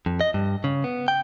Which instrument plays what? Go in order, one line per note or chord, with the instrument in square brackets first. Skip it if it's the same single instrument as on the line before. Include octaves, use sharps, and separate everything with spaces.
[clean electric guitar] F2
D#5
G2
C#3
B3
G5